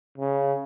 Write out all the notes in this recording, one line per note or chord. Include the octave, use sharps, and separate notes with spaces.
C#3